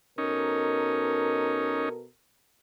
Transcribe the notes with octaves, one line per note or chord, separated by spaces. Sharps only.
B2 C#4 D#4 A4 A#4